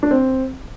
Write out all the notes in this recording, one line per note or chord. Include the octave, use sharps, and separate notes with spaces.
D4
C4